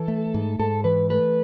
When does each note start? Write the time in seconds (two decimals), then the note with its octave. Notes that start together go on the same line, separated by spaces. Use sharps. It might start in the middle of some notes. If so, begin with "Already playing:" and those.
Already playing: E3 A4
0.08 A3
0.34 G#2
0.59 G#2 A4
0.84 E3 B4
1.10 A3 B4